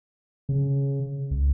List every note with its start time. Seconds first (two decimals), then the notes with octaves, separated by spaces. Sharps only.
0.49 C#3
1.31 C#2